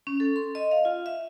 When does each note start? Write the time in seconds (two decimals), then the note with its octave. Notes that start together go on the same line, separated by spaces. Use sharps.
0.07 C#4
0.20 A4
0.36 C6
0.55 D#5
0.71 F5
0.85 F4
1.06 E5